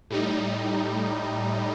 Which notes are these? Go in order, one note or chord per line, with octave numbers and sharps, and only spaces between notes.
A2 G3 D#4